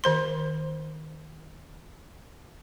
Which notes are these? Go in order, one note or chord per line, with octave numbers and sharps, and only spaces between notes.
D#3 C5 C6